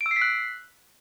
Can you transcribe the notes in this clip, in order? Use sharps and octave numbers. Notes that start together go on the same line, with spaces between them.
D7
E6
C7
B6
F#6